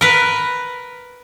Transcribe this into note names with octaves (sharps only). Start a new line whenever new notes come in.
A#4 B4